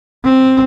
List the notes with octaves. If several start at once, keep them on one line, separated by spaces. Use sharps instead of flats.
C4